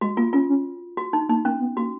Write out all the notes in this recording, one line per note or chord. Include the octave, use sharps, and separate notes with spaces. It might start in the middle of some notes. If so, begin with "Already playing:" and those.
G#3 F#4
A#3 F4
C#4 F4
C#4
F#4
D#4
A#3 D#4
A#3 C#4
B3
A#3 F#4